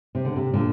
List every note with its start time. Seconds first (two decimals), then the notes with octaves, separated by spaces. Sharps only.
0.15 C3
0.25 D3
0.36 C3
0.54 A#2 D3